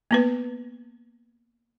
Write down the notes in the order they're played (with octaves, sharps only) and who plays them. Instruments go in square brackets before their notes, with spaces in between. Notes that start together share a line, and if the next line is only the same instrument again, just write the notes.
[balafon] A#3 B3 B4